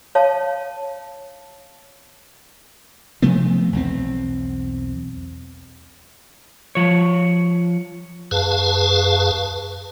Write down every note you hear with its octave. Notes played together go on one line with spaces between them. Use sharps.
C#5 F5 A5
C3 F3 A3 B3
B1 E2 C4
F3 C#5
F#2 G#4 B4 F5 A5